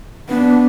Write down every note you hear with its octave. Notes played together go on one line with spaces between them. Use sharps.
B3 D4